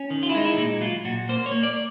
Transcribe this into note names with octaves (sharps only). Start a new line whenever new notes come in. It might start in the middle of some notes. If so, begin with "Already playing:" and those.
Already playing: C#4
D#3
F4
E4
G#3 D#4
E4
A#2 D#4
F#3 F4
A#2 F#4
A#3 C5
C#5
A#3
D5